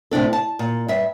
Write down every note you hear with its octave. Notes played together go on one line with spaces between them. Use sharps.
A2 C3 D4 A4
A5
A#2
G2 E5